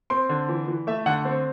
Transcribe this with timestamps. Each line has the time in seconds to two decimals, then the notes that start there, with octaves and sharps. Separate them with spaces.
0.10 C4 C6
0.29 D3
0.49 E3
0.67 E3
0.87 A3 E5
1.06 D3 F#5
1.25 C4